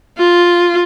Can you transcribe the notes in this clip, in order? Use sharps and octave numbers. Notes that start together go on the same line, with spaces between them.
F4